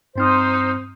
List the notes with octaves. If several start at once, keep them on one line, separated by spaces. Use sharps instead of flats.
G2 C4 D#4 C5 F6